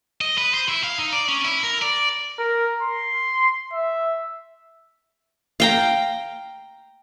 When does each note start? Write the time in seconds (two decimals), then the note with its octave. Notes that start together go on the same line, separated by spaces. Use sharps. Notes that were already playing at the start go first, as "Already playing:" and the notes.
0.21 D#5
0.38 B4
0.54 C5
0.69 E4
0.84 F5
0.98 D#4
1.13 D5
1.29 C#4
1.45 E4
1.63 A#4
1.82 D5
2.38 A#4
2.82 C6
3.73 E5
5.60 F5 G5 A#5